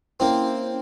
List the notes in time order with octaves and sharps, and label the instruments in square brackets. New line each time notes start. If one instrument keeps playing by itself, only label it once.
[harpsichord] A#3 C4 [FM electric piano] C#4 E4 C5